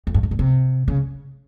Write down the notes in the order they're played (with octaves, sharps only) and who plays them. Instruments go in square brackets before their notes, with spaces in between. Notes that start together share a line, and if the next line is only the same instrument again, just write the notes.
[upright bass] F2
G2
G#2
A#2
C3
C#3